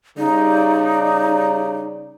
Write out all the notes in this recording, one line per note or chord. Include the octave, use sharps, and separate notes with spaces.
C#3 G3 D#4 D5